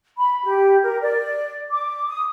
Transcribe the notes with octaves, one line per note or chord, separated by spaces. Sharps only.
B5
G4
A#4
D5
D6
D#6